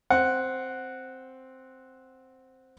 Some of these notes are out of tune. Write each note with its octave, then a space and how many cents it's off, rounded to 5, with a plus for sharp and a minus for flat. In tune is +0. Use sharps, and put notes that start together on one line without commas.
C4 +0 F#5 +0